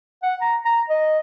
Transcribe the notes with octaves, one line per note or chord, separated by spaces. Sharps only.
F#5
A#5
A#5
D#5